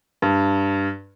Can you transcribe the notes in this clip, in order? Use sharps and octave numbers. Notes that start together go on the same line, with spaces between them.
G2